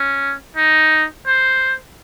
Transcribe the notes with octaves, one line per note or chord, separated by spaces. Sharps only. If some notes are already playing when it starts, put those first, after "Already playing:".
Already playing: C#4
D#4
C5